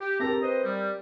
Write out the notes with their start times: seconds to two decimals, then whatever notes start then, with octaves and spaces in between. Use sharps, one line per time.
0.01 G4
0.20 C4 D4 G4 A4 A#4 A#5
0.41 B4 C5 D#5
0.63 G3